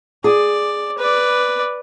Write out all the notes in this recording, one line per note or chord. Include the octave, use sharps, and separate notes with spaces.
G#4 D5
B4 D5